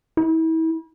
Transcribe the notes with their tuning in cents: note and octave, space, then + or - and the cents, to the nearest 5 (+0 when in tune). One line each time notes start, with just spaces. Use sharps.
E4 -35